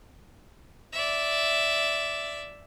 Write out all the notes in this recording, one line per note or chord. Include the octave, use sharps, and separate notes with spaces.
D5 E5